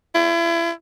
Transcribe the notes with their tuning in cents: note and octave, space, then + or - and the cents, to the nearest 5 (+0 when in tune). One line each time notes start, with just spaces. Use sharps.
E4 +35